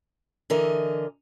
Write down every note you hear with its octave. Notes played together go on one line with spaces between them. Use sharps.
D3 E3 A#4 D#5